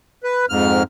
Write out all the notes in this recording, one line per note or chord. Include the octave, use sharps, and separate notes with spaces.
B4
F2 G#2 F6